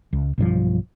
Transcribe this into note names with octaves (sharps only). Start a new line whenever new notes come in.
C#2
B1 G2 D#3 F3